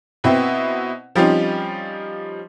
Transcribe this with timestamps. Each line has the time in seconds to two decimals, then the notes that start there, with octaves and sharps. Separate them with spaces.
0.24 B2 B3 C4 E4
1.15 F3 G3 C4 C#4 D#4 F4